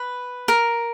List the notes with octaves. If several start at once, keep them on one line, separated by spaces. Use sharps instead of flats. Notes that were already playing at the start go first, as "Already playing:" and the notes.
Already playing: B4
A#4